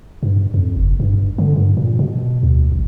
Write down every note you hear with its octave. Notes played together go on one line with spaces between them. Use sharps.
G2
F2
F#1
G2
D3
G2
A#2
B2
D2
A1